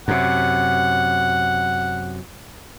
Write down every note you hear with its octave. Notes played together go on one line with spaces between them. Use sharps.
F#2 C3 F#5